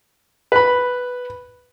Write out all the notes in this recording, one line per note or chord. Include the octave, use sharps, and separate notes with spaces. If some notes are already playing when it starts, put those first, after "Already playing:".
B4 B5